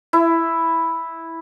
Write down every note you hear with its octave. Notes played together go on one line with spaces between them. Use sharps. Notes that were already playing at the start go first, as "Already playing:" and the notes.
E4